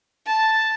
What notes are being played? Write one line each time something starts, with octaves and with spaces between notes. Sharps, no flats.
A5